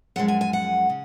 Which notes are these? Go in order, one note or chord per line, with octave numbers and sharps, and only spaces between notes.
F#2 F3 G#3 F#5
G#5
G#5
F#5
C#3